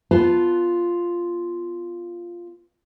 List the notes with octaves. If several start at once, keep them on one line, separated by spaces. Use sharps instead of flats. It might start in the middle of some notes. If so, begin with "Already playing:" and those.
B3 F4 B4 A5